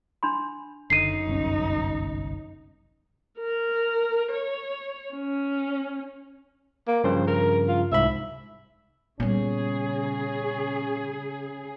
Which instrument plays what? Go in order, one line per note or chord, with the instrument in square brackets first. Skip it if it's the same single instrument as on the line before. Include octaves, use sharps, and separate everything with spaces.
[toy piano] D4 B5 C6
[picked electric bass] F#1 D3 [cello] F#2 D#4 [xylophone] C7 D#7
[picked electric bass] G1 C2 C#4
[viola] A#4
C#5
C#4
[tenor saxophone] A#3
[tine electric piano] G2 C#3 F3 [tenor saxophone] C5
[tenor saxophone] A#4
F4
[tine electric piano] C2 G#2 B5 [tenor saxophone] E5
[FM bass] A#2 [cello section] C#3 G#4 [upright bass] G3 B3 [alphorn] C#4